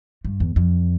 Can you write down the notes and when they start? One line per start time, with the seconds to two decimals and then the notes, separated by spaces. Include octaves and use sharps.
0.25 G2
0.40 E2
0.56 F2